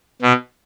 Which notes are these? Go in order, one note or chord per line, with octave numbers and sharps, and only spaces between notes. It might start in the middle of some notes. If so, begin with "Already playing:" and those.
B2